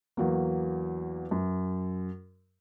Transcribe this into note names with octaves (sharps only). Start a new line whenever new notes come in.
E2 F#3 A#3
F#2